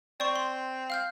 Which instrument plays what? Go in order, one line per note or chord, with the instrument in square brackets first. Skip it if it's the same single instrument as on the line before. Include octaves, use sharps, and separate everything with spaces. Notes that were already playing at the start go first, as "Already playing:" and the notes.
[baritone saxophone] C4 [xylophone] D5 C#6
[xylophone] C6
F5 F6 G6